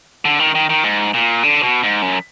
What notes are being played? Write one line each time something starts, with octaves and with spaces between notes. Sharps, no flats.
D3
D#3
D#3
D#3
G#2
A#2
D3
B2
G#2
F#2